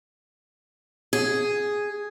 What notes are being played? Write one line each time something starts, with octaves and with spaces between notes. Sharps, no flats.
G#4